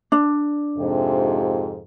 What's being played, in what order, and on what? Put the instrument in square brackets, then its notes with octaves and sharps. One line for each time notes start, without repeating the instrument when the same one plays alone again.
[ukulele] D4
[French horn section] F2 G#2 C3